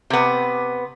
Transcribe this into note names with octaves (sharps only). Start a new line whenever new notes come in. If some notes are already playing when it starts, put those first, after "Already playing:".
C3 B3